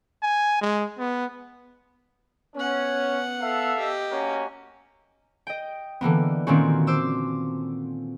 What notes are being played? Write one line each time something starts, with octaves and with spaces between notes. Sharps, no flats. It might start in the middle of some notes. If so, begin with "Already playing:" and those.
G#5
G#3
B3
B3 C#4 F#5
A4 E5 F5
G4 D#5
A#3 C#4 F#4
D#5 G5
D3 E3 A#3 B3
A#2 D#3 A#3 C4 C#4 F#4
C5 D6 E6